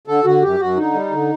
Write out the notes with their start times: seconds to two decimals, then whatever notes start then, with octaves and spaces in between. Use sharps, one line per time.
0.07 D3 A4
0.24 D3 F#4
0.42 F#2 G4
0.59 F#2 F#4
0.77 D3 D#4
0.94 G3
1.11 D3